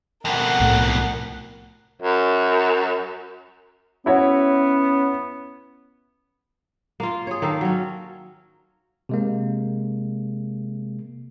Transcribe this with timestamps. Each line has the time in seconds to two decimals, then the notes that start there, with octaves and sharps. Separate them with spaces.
0.25 F2 B2 A#4 F#5
0.60 C2 A2
2.02 F#2
4.06 B3 C#4 E4 F#4 C#5
7.00 A#3 F4
7.27 G#4 C#5
7.42 D#3 A#3 A4
7.61 F#3 C#4
9.09 C3 G#3 A#3